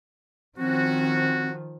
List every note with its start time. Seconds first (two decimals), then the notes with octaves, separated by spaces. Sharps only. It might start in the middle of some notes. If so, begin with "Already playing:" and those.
0.58 D#3 F3 C4 C#4 F#4